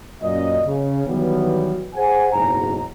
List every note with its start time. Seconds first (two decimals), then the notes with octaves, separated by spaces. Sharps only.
0.23 F#2 A#2 C#4 D#5
0.66 C#3
1.07 D#3 E3 F#3 G3 B3
1.95 G#4 C5 F#5 G#5
2.33 F#1 B1 G#2 A#5